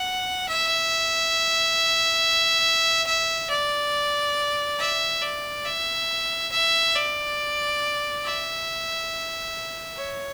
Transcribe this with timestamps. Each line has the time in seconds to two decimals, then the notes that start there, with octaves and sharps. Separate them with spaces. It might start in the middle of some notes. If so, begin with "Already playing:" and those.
Already playing: F#5
0.48 E5
3.06 E5
3.49 D5
4.79 E5
5.22 D5
5.65 E5
6.52 E5
6.95 D5
8.24 E5
9.97 C#5